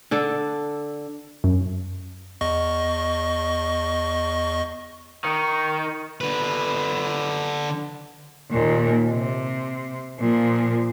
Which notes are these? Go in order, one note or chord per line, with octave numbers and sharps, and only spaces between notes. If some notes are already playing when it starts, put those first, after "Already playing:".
D3 D4 A4
F#2
E2 D#5 C#6
D#3 C#6
D3 B4
D#2 A#2
C3
A#2 F3